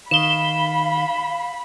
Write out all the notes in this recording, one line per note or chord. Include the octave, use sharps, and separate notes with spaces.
D#3 F5 B5 E7 G7